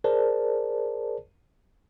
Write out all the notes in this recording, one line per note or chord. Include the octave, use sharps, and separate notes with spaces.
G#4 A#4 C5 D5 A5